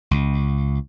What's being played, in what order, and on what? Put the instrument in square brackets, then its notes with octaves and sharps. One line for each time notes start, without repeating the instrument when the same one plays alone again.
[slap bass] C#2